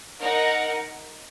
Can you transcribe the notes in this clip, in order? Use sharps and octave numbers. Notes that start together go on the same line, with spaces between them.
D#4 A#4 F#5